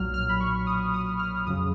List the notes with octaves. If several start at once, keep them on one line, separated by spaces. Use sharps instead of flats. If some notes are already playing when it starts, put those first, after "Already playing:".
Already playing: B1 A#2 F#3 F6
F6
B5
C#6
D#6
D#6
F6
F2 C#3 F#3 D#6